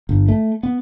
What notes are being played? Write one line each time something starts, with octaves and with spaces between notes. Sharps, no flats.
G1
A3
B3